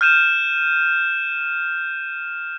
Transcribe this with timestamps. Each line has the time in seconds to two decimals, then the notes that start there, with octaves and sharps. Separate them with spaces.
0.01 F6 G6 D#7 E7